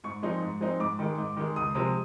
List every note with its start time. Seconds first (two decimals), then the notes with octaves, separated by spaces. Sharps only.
0.04 G#2 C#6
0.23 F3 G#3 C4 D#4
0.42 G#2
0.61 F3 G#3 C4 D#4
0.80 G#2 D6
0.99 D#3 G#3
1.18 G#2
1.37 D#3 G#3
1.56 C#2 D#6
1.75 C3 F3 G#3